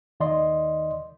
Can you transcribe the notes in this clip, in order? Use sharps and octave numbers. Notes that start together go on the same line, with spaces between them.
D#2 D#3 D5 D#5 C6